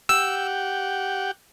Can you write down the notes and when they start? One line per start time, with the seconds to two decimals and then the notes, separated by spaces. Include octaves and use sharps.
0.09 G4 F#5 G5 E6